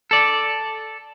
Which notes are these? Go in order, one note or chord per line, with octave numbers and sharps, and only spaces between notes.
A4 D5